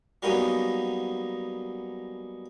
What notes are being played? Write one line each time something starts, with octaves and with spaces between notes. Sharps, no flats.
F#3 G3 A#3 B3 C#4 D#4